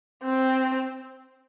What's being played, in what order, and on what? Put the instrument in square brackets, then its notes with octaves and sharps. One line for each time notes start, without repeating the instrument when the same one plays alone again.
[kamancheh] C4